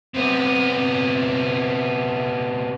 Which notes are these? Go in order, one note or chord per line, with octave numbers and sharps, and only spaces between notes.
C3 B3